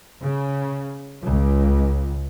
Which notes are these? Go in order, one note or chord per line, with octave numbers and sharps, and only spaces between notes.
C#3
C#2